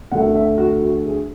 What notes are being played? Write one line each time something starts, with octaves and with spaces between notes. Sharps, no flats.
D2 D3 A3 F#5
E5
F#4
F#4
G#4